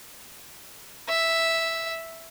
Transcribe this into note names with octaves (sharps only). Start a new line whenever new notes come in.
E5